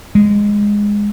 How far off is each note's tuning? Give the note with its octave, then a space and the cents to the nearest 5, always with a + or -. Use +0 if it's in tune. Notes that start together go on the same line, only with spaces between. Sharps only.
G#3 -10